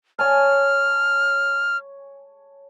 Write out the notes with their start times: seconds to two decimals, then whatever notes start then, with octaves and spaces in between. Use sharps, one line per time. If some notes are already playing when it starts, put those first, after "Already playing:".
0.19 C#5 G#5 A5 F6